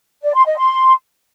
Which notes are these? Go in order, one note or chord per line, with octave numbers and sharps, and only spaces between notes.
D5
C6
D#5
C6